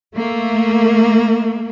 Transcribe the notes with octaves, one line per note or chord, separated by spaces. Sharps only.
A3 A#3